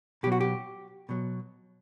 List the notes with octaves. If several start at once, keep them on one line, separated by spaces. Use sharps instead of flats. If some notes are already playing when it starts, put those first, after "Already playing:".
B2 F#3 G4
F#4
G4
B2 F#3